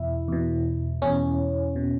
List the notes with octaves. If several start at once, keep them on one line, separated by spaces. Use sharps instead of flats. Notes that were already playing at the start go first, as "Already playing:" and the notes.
Already playing: E2 B2 E4
E2 B2
E2 B2 C#4
B2